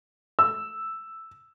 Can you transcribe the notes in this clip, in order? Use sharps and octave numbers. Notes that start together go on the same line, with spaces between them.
E6